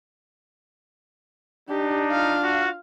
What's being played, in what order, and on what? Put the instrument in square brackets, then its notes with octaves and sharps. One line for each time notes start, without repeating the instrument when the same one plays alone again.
[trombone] D4 [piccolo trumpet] D#4 [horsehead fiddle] G4
[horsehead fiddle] F4 F5
[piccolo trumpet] F#4